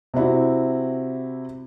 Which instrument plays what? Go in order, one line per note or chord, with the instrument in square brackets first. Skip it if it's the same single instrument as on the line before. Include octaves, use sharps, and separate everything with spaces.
[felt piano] C3 C4 E4 F#4